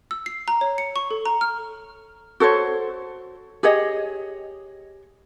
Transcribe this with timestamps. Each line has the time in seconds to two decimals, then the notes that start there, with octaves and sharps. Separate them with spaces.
0.11 E6
0.26 C7
0.48 A#5
0.61 C#5
0.78 C#7
0.96 C#6
1.11 A4
1.26 A#5
1.41 F6
2.40 F#4 A4 C5 C#5
3.63 G4 G#4 C#5 D#5